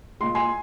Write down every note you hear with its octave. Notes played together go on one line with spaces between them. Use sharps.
A#2 G#3 C6
G#5 C6